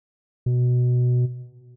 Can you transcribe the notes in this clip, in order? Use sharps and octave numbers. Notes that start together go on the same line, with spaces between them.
B2